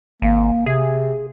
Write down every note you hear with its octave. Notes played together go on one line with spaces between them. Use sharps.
G#1 A#3
C3 G#4